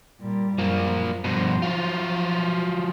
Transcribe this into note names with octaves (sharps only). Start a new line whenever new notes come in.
A#2 G3
F#2 F3 A#3
G2 B2 F3 C5
F#3 F4
F3